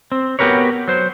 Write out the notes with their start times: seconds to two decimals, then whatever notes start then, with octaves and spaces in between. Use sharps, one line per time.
0.12 C4
0.39 B3 F#4 G4 A#4 B4 C#5
0.88 F#3 C5